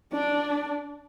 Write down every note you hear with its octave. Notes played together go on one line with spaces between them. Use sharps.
D4